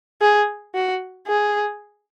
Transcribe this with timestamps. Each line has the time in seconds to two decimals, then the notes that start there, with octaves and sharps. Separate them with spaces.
0.21 G#4
0.75 F#4
1.27 G#4